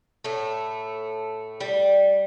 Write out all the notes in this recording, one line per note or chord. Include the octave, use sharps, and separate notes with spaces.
A2 A3
G3